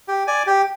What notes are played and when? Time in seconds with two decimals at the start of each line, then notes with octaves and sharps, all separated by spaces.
0.08 G4
0.27 D5 G#5
0.47 G4